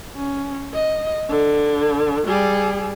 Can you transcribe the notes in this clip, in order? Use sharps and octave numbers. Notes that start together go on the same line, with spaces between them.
C#4
D#5
D3
G3 G#4